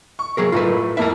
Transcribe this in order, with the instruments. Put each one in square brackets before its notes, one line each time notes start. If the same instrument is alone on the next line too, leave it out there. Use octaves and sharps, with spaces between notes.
[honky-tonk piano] C#6
[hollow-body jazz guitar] F#3 G#4 A#4
[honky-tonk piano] A2 [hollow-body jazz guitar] F4 A#4 B4
[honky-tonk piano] F2 A#3 E4 [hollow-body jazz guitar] A#4 E5